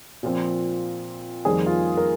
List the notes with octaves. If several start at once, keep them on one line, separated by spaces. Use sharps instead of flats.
A#2 F3 C4
F2 D#3 G3 A#3 G#4
F4
A#4